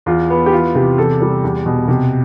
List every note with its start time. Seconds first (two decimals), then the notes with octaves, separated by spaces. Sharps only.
0.06 E2 F4
0.30 B3
0.46 G4
0.52 E3 F4
0.75 C3 G4
0.98 E2 A4
1.21 G3
1.44 E2
1.66 B2
1.88 C3